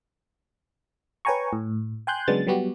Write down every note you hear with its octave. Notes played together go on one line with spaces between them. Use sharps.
B4 C#5 G5 G#5 A#5 C#6
A2
G5 G#5 C6 F#6 G6
C#3 F#3 G#3 B3 D4 A6
F#3 G3 B3 F#4 G4